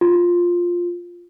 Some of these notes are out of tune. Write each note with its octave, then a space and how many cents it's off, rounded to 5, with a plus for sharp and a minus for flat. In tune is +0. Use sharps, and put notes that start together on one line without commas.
F4 +5